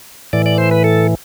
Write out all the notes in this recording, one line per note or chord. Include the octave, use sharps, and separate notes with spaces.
A2 E3 D5
D5
C5
B4
A4